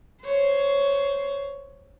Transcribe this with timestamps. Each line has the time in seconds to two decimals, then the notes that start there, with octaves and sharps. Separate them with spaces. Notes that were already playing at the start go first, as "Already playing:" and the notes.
0.24 C5 C#5